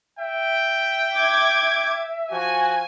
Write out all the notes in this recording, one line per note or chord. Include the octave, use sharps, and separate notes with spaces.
E5 G5
D6 G#6
F3 F#4 G#5